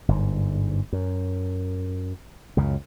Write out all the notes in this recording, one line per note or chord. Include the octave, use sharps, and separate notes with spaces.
G1 G#2
F#2
C#2 F#2 C#3